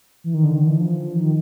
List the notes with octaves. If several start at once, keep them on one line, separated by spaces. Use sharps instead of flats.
E3
D#3
D3
D#3
E3
F3
D#3